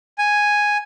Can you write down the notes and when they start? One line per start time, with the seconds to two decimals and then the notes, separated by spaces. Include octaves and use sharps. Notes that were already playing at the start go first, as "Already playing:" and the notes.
0.18 G#5